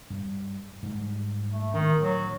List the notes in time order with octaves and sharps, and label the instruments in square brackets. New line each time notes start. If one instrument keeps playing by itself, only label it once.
[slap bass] G2 G3
G#2 G3
[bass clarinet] A3
[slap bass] D1 D4 [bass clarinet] D#3
[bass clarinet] F#3